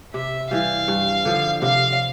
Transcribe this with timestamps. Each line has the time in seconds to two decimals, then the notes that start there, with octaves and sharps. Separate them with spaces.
0.14 C3 E5
0.50 E3 G3 F5
0.88 G2
1.25 D3 F3
1.62 C3 F5